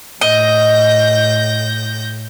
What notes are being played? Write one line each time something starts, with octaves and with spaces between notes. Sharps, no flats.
A2 D#5 G6 A#6